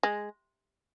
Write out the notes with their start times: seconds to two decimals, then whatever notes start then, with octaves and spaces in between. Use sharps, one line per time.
0.03 G#3